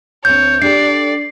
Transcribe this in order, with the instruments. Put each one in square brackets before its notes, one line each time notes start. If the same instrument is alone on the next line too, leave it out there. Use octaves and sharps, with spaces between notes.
[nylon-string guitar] D2 C4 [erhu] C#5 [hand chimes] G6
[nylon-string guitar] D4 G4 A4 [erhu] D5 [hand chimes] C7